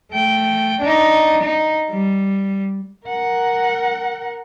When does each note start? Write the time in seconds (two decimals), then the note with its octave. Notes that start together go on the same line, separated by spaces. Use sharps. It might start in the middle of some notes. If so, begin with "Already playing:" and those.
0.12 A3 G5
0.81 D4 D#4
1.42 D#4
1.90 G3
3.06 A#4 F#5